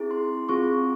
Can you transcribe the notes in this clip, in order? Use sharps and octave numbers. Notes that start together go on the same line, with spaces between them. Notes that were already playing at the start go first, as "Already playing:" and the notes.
Already playing: C4 E4 G#4
C6
C4 F4 G#4 C#6